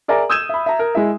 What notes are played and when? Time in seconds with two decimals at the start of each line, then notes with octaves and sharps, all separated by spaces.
0.08 G#4 A#4 D5 E5 G#5 A#5
0.30 D#6 E6 G6 G#6 D#7 E7
0.49 E5 B5
0.66 E5 A#5
0.79 A#4
0.95 G#3 E4 G#4 E5